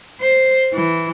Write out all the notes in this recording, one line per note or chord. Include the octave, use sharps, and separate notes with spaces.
C5
E3